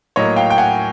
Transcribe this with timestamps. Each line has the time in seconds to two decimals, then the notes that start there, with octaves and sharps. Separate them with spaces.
0.16 A2 F#3 A#3 C#5 D#5
0.36 F5 G5
0.50 G5
0.58 F#5 G#5